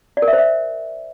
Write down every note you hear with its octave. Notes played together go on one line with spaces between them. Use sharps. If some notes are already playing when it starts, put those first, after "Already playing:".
D5
A#4
E5
C5
E5